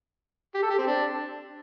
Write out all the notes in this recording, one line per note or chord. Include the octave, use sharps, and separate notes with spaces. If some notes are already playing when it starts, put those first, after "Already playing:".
G4
A4
G4
C4
D4